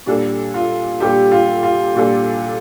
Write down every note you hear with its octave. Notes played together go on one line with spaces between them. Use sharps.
A#2 G3 D4 A4
F4
A#2 G3 D4 G4 A4
F4
F4
A#2 G3 D4 A4